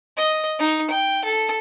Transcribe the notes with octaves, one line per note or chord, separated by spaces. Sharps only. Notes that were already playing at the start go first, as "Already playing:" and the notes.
D#5
D#4
G5
A4